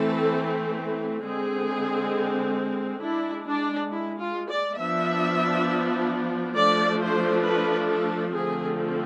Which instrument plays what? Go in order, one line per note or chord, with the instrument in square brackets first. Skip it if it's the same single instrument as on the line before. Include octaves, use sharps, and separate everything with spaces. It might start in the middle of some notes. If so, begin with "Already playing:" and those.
Already playing: [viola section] E3 A3 C4 A4
D3 G#3 C4 G#4
G#3 D4 E4
D4
E4
F4
D5
F3 B3 D4 E5
F3 A3 D4 D5
C5
B4
A4
D3 F3 A3 C4 G#4